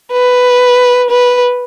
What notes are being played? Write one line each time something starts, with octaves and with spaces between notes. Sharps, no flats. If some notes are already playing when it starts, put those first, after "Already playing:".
B4
B4